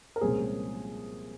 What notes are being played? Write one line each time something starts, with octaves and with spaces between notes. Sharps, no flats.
A#4
C2 A#2 F3 G#3 C#4 G#4 C5